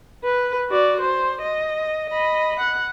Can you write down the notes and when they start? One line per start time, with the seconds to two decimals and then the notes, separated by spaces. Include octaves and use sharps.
0.24 B4
0.69 F#4 D5
1.01 C5
1.42 D#5
2.10 D#5 B5
2.60 F#5